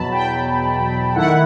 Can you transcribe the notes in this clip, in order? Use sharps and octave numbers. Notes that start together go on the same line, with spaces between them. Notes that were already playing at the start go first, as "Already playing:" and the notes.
Already playing: E2 B2 F#3 A5 B5
G5
D#3 A3 E4 F#5